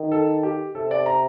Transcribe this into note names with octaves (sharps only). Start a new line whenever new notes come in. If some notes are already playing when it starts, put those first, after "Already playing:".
Already playing: D#3
A4
G4
C3 A4
D5
A#5